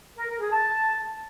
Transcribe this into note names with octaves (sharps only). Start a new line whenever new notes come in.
A#4
A#4
G#4
A5